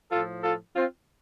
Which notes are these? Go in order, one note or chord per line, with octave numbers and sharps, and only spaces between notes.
A2 F3 F4 A4
F4 A4
C4 F4